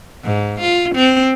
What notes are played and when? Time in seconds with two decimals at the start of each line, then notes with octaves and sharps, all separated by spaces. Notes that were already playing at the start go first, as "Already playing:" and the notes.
0.24 G#2
0.61 F4
0.95 C4